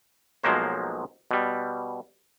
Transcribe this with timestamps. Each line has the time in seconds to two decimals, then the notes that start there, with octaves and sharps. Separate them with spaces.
0.43 B1 F3 F#3 G#3 A#3 C5
1.31 B2 G3